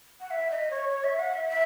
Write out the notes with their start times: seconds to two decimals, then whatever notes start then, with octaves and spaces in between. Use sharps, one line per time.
0.20 F#5
0.31 E5
0.51 D#5
0.71 C#5
0.89 C#5
1.04 E5
1.19 F#5
1.34 E5
1.49 E5